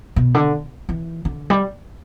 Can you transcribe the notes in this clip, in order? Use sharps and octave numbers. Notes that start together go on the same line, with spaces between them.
B2
D3
E3
D3
G3